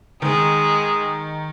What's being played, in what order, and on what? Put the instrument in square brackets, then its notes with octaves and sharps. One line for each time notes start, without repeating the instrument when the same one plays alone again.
[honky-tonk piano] D#3 [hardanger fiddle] G#3